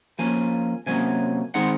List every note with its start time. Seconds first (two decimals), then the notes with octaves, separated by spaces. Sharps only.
0.19 F3 A#3 C#4 G#5
0.86 C3 F#3 A#3 C#4 G#5
1.54 D#3 G#3 C4 D#4 F#5